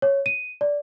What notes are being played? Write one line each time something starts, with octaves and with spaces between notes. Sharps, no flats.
C#5
D#7
D5